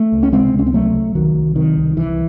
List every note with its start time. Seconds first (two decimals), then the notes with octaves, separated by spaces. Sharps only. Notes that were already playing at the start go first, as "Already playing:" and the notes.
Already playing: A3
0.12 C#2
0.23 C#4
0.33 C3 G#3 C4
0.53 C#2
0.59 C#4
0.66 C4
0.73 C3 F#3 A3
0.95 C2
1.15 C2 D#3 F#3
1.36 C2
1.56 C3 D#3
1.77 C2
1.97 C2 E3